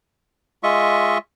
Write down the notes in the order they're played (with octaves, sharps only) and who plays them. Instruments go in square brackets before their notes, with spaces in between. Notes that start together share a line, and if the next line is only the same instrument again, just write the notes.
[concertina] G#3 F4 D#5 E5 C#6